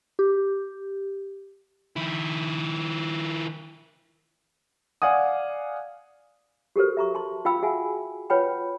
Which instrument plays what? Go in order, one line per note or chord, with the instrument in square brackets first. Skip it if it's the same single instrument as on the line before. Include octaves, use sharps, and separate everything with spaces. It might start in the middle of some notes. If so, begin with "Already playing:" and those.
[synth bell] G4
[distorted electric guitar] D#3 E4
[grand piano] D5 F5 F#5 G#5 D#6
[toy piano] F#4 G4 A4 A#4 C5
E5 A#5 C#6
A5 C6
F4 F5 G5 B5 E6
F#4 G#4 E5 F#5 G#5
F4 B4 C#5 F#5 G5 B5